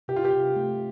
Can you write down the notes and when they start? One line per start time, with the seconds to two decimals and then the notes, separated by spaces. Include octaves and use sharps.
0.08 C3 G4
0.16 F4
0.25 G4
0.33 C3
0.56 A3